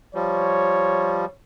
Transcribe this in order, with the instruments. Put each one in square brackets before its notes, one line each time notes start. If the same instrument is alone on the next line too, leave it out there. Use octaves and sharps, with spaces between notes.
[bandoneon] F3 G3 [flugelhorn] C#5